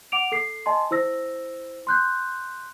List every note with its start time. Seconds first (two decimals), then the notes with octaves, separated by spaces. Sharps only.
0.12 F#5 D6 D7 F7
0.32 A4 C7
0.66 D#5 G#5 A5 C6
0.91 E4 C5 E6 A#6
1.87 C6 F#6 G6